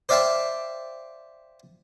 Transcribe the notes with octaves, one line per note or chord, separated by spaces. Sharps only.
C5 D5 E5 F5 G5 A5